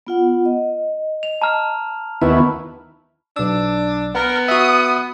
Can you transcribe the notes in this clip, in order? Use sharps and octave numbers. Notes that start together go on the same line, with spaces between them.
B3 F4 F#5
D#5
F7
A5 A#5 F6
D#2 B3 E4 B5 C#6
B1 D4 E6
B3 A#4
F#4 E5 D#6